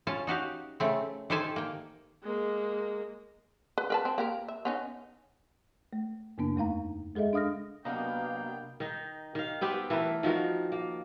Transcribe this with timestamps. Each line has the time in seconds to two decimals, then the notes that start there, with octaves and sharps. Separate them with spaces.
0.07 C#4 F4 A5
0.27 D#4 F#4 G4 F5
0.80 C#3 A3 C4
1.30 D#3 G4 A4 C5 G#5 A5
1.56 A#3 G5
2.23 G#3 A#3
3.78 B4
3.90 A#4 B4 A5
4.05 C4
4.18 A#3 G4 A#4
4.48 E5
4.65 B3 C#4 D#4
5.93 A3
6.38 F#2 C#3 A#3 B3 D4
6.56 E2 A3 D#4 F5 A#5
7.15 G#3 G#4 A4 D#5 E5
7.33 D4 F5 D#6 F6 A#6
7.85 C3 F#3 A#3 B3 D4 D#5 F5 G5
8.80 D#3 D#4
9.35 D#3 F5
9.61 B3 C4 G4 B4
9.90 E3 A3 A#4 B4
10.23 D#3 F3 F#4 A#4
10.72 A#3